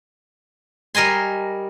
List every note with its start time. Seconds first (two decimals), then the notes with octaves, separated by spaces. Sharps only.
0.95 G3 A#4 D#5 G#5 C6